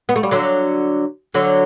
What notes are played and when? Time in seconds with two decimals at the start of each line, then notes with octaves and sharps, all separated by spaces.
0.09 B3
0.16 A3
0.23 G3
0.31 D3 F#3
1.34 D3 F#3